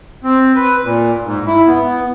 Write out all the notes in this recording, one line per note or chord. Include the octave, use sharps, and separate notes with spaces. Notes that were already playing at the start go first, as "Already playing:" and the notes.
C4
B4
A#2
G#2
E4
B3